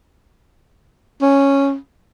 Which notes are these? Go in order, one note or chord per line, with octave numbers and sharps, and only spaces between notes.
C#4